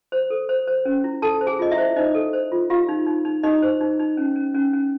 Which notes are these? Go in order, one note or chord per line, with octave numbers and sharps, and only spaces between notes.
C5
A4
C5
C5
C#4
E4
A4 A5
C5
G#4 G#5
F4 D#5
E4 E5
C5
D#4 C5 D#5
A4
C5
F4
F4 G4 F5
D#4
D#4
D#4
D#4 G4 D#5
C5
D#4
D#4
C#4
C#4
C#4
C#4